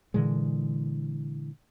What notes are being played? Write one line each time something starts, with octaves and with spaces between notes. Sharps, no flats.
A#2 D3 E3 G#3